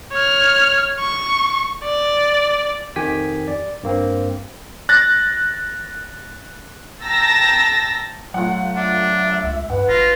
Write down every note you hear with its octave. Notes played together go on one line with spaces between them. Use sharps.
C#5 F6
C#6
D5
F2 D#3 G4 G5 G#5 B6
D5
G2 A#3 C4
F#6 A6 A#6
G5 A5 A#5 E6 A6 A#6
F#3 A3 F4 F#5
D4 E5
C#2
G2 B4 F#5
G#1 F4 A#6